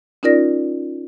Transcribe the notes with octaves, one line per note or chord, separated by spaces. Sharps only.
C#4 D#4 F4 A#4 D5 A#6